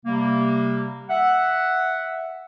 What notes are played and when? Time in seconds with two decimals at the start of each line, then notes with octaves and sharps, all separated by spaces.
0.06 C3 G3 A#3
1.10 E5 F#5